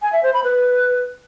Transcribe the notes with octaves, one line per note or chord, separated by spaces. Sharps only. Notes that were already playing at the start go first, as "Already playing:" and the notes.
G#5
E5
C5
B5
B4